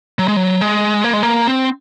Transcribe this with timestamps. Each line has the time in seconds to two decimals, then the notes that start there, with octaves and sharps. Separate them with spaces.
0.19 F#3
0.28 G#3
0.36 F#3
0.61 G#3
1.04 A#3
1.13 G#3
1.23 A#3
1.47 C4